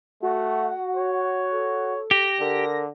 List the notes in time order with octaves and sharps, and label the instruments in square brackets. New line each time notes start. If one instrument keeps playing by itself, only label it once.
[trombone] A3 [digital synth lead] F#4 [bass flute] F#5
[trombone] C#5
[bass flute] A4
[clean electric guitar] G4 [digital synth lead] A#6
[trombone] D3 [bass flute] A#4